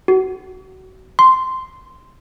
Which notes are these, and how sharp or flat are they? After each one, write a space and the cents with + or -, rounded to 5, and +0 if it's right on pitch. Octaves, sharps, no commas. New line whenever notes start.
F#4 +25
C6 -5